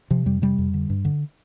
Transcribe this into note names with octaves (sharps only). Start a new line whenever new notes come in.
C3 F3
F2 G3
C3 G3
F2
D3
G2
D3